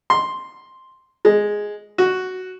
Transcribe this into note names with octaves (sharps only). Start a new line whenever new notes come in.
C6
G#3
F#4